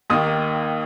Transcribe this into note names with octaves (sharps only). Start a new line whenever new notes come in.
D#2 D#3 A#3 D#6